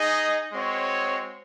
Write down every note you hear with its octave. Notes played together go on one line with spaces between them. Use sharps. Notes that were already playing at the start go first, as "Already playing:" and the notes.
Already playing: D#4 G#4 D#5
G#3 C4 F#4 C#5